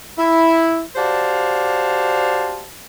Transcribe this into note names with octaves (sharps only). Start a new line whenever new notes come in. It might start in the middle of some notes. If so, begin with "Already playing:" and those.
E4
F#4 G4 C5 D5 F5 A5